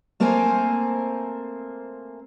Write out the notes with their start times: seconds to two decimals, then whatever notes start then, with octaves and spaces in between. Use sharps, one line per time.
0.20 A3 A#3 C4 A#4 C5 G#5